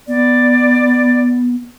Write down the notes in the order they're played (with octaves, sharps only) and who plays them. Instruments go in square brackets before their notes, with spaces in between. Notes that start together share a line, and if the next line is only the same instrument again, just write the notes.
[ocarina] B3 [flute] D5